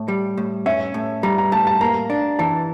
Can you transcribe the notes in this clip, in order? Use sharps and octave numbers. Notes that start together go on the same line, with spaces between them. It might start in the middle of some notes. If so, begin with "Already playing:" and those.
Already playing: A2
G3
A2
C#4 E5
A2
G3 A#5
A#5
A2 A5
A5
A#3 A#5
D4
E3 A5